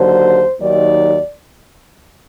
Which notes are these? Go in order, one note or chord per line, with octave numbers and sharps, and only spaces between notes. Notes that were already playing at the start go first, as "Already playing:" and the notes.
Already playing: D#2 D3 F#3 C5
D#2 D#3 F#3 D5